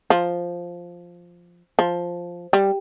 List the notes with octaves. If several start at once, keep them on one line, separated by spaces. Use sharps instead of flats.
F3
F3
G3